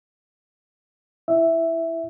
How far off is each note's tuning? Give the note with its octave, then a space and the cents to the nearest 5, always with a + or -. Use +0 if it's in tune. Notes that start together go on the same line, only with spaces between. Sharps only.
E4 +0 E5 +0